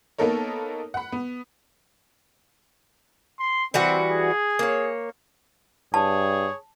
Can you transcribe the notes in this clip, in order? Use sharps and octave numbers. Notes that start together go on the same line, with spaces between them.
A#3 B3 D#4 A4 A#4 C#5
F#5 B5
B3
C6
E3 G3 C4 F#4
G#4
A#3 C#5
G2 G#4 C#5 A5